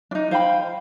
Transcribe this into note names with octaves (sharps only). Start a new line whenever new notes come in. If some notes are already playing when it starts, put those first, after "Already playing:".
D4 D#4
C5 F5 G5 B5